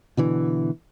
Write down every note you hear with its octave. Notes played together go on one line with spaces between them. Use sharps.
B2 D3 E3